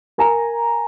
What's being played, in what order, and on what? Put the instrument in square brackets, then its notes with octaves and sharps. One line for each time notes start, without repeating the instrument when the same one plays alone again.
[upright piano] A#4 G#5 A#5